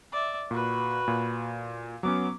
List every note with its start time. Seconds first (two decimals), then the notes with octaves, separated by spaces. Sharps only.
0.12 D5 E5
0.51 A#2 F#4 B4
1.08 A#2
2.03 F#3 B3 C#4 D6